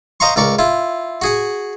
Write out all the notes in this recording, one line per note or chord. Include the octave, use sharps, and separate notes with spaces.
C5 D#5 F5 A#5 C6 C#6
C#2 A#4 D5 C#6
E4 F4
F#4 G#4 F#5